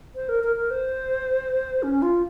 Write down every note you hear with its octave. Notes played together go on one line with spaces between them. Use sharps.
C5
A#4
A#4
A#4
C5
C#4
F4